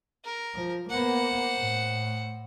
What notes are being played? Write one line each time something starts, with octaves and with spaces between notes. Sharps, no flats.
A#4
F3
A#3 B3 C5 F#5
A2